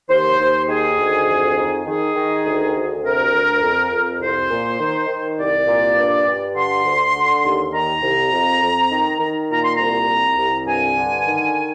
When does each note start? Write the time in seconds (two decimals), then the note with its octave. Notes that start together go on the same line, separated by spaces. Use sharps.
0.09 D#2 C5
0.38 D#2
0.68 D#3 G#4
0.98 D2
1.27 F2
1.56 D#3
1.86 D#3 G#4
2.15 D#3
2.44 D2
2.74 D2
3.03 C3 A#4
3.32 D2
3.62 F2
3.91 F2
4.20 C2 C5
4.51 A#2
4.79 D#3
5.08 D#3
5.38 C2 D5
5.67 A#2
5.97 G2
6.26 G2
6.55 D3 C6
6.85 D2
7.14 D3
7.44 D#2
7.73 D#3 A#5
8.02 C2
8.32 F2
8.62 F2
8.91 D#3
9.20 D#3
9.49 A#2 A#5
9.63 C6
9.76 C2 A#5
10.08 C2
10.37 C2
10.67 G2 G#5
10.96 D3
11.26 D#3